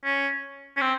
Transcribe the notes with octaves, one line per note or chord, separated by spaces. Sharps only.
C#4
C#4
C4